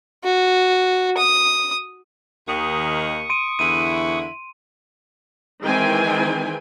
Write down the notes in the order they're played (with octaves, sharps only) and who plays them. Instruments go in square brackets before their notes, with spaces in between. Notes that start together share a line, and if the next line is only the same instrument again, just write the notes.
[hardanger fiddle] F#4
D#6
[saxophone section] D#2 D#3 [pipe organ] C#6 D#6
[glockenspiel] C6 D7 D#7
[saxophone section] E2 D3 E4 [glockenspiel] D#7
[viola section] D#3 E3 G#3 C4 G5 G#5